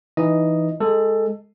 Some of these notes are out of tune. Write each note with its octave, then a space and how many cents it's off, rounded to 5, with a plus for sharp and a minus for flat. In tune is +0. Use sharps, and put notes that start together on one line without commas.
E3 +0 D#4 +5 D#5 +0
G#3 +0 A4 +15